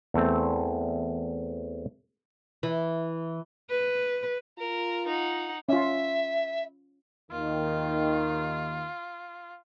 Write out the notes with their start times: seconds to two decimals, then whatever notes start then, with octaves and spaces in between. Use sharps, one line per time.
0.14 E2 A3 C4
2.63 E3
3.70 B4
4.58 F4 A#4
5.08 D#4 F#5
5.69 C#4 F4 E5
7.31 D#2 D#3 F4